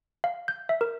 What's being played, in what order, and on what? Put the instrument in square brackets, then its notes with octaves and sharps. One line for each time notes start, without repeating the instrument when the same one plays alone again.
[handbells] F5
G6
E5
A#4